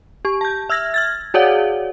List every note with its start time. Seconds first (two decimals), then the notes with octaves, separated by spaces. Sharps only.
0.25 G4 C#6
0.41 A5 G6
0.69 E5 E6 F6 G#6 A#6
0.94 F6 G#6 A6
1.34 F#4 G#4 C#5 D5 F5 F#5